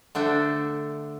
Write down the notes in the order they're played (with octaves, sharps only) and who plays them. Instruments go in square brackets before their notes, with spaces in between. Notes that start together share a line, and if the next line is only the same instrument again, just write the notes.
[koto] D3 A3 D4 C5